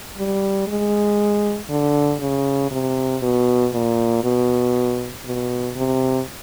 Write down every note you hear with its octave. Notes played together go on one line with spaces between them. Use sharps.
G3
G#3
D3
C#3
C3
B2
A#2
B2
B2
C3